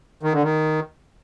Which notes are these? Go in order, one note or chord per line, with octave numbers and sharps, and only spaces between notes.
D#3
D3
D#3